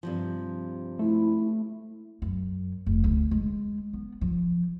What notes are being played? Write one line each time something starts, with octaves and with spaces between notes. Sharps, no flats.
G2 C3 F3
A3 E4
F#2
F1
D2
G#3
B3
F3